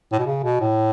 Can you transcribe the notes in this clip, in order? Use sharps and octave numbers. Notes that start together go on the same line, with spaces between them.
A2
B2
C#3
B2
A2